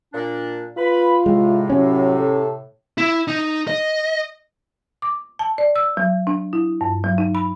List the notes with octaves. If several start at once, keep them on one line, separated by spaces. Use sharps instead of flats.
A#2 D4
F4 B4 B5
A2 C3 G#3
F#3 C#4
A4
E4
D#4
D#5
D6
A5
D5
E6
F#3
D4
E4
G2
F#3
D#4
B5